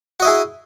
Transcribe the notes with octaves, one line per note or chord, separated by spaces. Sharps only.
E4 F#4 G#4 D#5